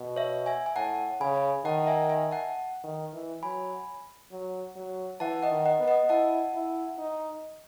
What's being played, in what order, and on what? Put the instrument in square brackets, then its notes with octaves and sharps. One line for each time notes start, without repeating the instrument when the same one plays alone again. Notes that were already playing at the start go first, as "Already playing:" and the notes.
Already playing: [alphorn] B2
[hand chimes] C#5 E5
E5 G#5
G#5
[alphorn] A2 [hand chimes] F#5 A5
[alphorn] C#3 [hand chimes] G#5 B5
[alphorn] D#3 [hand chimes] F#5 A5
[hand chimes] E5 G#5
E5 G#5
F#5 A5
[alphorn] D#3
E3
[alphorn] F#3 [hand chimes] G#5 B5
[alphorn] F#3
F#3
[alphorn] E3 [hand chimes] F#5 A5
[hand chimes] D#5 F#5
[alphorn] D#3
[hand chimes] D#5 F#5
[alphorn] B3
[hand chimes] D#5 F#5
[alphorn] E4 [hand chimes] F#5 A5
[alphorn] E4
D#4